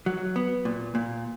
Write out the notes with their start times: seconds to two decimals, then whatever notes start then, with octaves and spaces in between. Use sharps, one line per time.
0.06 F#3
0.36 B3
0.65 A#2
0.95 A#2